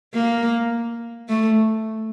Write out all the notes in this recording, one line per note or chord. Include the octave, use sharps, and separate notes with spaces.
A#3
A3